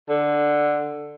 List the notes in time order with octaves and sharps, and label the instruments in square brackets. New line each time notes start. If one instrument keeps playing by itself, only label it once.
[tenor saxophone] D3